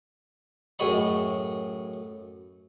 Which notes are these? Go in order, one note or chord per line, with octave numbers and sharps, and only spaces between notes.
F#2 A2 G#4 C#5 D#5 B5